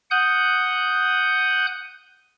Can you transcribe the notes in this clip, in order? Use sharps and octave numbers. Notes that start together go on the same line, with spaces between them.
F#5 D#6 F#6 G6